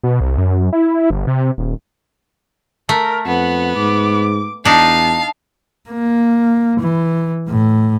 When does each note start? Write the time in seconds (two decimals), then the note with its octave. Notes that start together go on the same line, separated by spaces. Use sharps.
0.03 B2
0.20 C2
0.38 F#2
0.73 E4
1.10 G1
1.27 C3
1.58 D#1
2.89 A3 A#4
3.26 F2 B3 F#5
3.76 G#2 D6
4.65 E2 D4 D#4 F5 A5
5.90 A#3
6.81 E3
7.49 A2